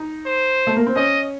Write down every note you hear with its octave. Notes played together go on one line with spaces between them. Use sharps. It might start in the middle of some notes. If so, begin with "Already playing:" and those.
Already playing: D#4
C5
A3
A#3
C4
C#4 D#5